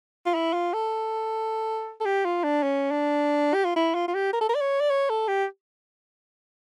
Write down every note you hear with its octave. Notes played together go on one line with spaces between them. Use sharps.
F4
E4
F4
A4
A4
G4
F4
D4
C#4
D4
G4
F4
E4
F4
F4
G4
A#4
A4
A#4
D5
C#5
D5
C#5
A4
G4